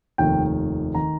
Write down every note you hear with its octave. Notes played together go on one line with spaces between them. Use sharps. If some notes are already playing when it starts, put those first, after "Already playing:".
F1 D#2 D#3 G5
D#3 A#5